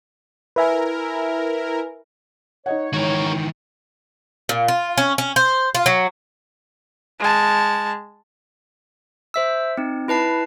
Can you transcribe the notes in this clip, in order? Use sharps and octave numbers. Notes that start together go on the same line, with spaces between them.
E4 A#4 B4 E5 G#5
D#4 C#5 D#5 F#5
G#2 D#3 E3 F#4 A#4
A#2
F4
C#4
C#4
C5
F4
F#3
G#3 A5
C5 E5 E6
C4 D#4
E4 B4 A5 C7